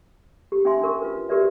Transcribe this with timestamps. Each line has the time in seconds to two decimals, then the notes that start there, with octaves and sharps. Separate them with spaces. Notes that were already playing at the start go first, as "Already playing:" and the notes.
0.52 G4
0.65 C#4 D#4 G4 E5 G#5 C6
0.82 D4 A#4 C#6
1.02 F4 B4
1.29 F#4 G4 A#4 B4 D5 E5